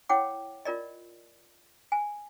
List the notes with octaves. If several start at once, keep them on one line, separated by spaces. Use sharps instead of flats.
E4 C#5 F#5 G5 D6
F4 A#4 D5 D#5
G#5